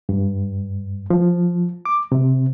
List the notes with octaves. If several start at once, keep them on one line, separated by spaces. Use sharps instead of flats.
G2
F3
D6
C3